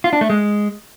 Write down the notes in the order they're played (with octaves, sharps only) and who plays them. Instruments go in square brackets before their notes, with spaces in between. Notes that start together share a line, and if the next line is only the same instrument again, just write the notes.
[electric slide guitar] F4
D4
A3
G#3